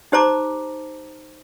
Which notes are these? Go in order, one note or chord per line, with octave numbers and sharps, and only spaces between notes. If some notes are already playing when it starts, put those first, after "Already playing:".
D#4 G4 C5 A5 A#5 D6